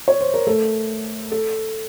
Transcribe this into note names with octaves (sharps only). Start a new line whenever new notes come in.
C#5
C5
A#4
A3 A4
A4